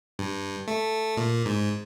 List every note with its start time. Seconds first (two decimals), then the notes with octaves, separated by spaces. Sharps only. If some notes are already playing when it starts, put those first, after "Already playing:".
0.19 G2
0.68 A3
1.17 A#2
1.46 G#2